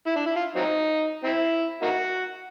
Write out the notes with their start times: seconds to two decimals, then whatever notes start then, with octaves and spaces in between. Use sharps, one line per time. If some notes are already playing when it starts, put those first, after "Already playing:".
0.07 E4
0.16 D4
0.26 E4
0.36 F4
0.56 F#3 C4 D#4
1.24 C4 E4
1.82 A#3 D#4 F#4